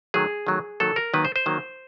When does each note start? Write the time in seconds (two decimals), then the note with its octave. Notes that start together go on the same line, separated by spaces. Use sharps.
0.14 D#3 F#3 A3 G#4
0.47 D#3 F#3 A3
0.80 D#3 F#3 A#3 A4
0.96 A#4
1.14 D#3 F#3 A#3 B4
1.25 C5
1.36 C5
1.46 D#3 F#3 A#3